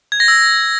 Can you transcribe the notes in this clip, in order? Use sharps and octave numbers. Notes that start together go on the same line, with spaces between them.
G#6
A#6
E6